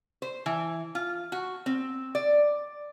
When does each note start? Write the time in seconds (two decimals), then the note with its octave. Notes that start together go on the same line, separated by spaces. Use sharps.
0.22 C5
0.46 E3
0.95 F4
1.32 F#4
1.66 C4
2.15 D5